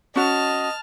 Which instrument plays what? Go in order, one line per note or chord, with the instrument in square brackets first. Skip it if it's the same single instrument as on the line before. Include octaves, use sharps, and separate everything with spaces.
[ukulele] C#4 F#4 [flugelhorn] D#5 [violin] A5 F6